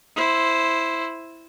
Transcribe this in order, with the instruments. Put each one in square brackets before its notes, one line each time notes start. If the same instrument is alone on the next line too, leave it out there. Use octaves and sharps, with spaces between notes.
[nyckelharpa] E4 C5